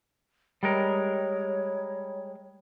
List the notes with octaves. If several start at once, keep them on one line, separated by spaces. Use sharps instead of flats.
G3 G#3 A#4 C#5